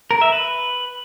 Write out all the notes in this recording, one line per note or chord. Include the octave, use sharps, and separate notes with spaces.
A#4
E5
B4